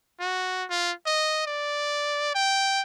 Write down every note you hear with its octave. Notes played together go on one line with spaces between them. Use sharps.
F#4
F4
D#5
D5
G5